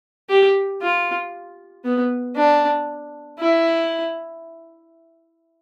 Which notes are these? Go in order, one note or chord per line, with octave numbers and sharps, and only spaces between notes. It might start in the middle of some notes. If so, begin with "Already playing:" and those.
G4
F4
B3
D4
E4